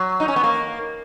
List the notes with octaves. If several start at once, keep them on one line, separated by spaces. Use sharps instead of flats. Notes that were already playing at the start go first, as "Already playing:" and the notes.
Already playing: F#3
D#4
C#4
B3
A#3